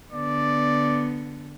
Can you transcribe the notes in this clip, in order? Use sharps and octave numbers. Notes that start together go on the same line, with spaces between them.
D3 B3 D5